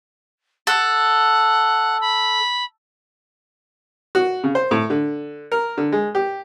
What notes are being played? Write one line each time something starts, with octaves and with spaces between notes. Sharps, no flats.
A4 F#5
B5
F#4
C#3
C5
A2
D3
A#4
D3
G#3
G4